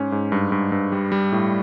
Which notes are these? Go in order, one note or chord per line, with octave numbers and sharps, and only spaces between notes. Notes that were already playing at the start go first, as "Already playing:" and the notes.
Already playing: G#2 C#4
G#2
G2
G2
G2
G3
G3
A2